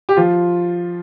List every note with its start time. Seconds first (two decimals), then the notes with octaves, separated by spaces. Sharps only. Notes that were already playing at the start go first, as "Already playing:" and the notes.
0.09 G4
0.16 F3 F4